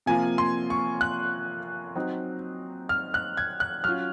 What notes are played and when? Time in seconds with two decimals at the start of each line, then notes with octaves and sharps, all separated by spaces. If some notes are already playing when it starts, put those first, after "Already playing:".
0.06 C3 F3 A#3 F4 G#5
0.38 C6
0.70 C#6
1.01 F#6
1.96 F#3 C4 D#4
2.89 F6
3.14 F#6
3.37 G#6
3.60 F#6
3.84 F#3 C#4 F4 F6